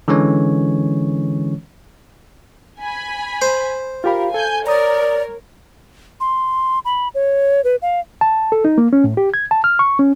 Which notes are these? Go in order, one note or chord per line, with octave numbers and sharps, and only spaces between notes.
D3 E3 G#3 C#4 C#5
G#5 B5
C5
F4 G4 A#4 F5 B5
A4 G#5 G6
A#4 C#5 D5 A#5 D#6
C6
B5
C#5
B4
F5
A5
A4
D#4
A#3
C#4
A2
G4
G#6
A5
F6
C#6
C#4